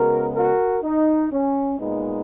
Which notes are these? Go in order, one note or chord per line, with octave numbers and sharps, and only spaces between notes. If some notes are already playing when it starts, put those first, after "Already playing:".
Already playing: C#3 G#3 B3 F#4 A#4
F#4 A#4
D#4
C#4
A#2 G#3 B3 D#4